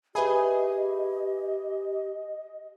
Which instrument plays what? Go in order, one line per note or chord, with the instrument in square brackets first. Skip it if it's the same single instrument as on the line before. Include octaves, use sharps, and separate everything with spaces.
[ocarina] G4 [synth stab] G#4 [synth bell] B4 E5 B5 [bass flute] D#5